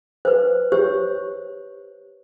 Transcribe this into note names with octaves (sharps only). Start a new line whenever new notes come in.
B4 C5
G4 C5 C#5